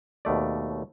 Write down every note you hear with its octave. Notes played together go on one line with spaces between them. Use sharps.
D#2 B2 A3 D5